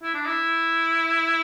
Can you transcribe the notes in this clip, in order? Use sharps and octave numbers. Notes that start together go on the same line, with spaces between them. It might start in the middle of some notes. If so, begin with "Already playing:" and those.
E4
D4
E4